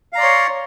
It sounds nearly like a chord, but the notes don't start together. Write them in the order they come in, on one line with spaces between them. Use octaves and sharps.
F5 A#5 D5 C6 C#5